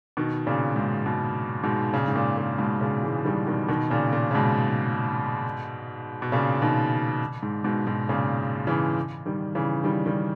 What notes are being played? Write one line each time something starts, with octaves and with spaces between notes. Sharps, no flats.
B2 D#3
A#2 C#3
G#2 B2
G#2 B2
G#2 B2
A#2 C#3
G#2
A#2
A#2
G#2 B2
A#2 C#3
E3 G#3
D#3 G3
B2 D#3
B2 D#3
A#2 C#3
A#2
C#3
G#2 B2
B2
A#2 C#3
B2 D#3
G#2
G#2 B2
G#2 B2
A#2 C#3
C#3 E3
D#3 G3
C#3 E3
D#3 G3
D#3 G3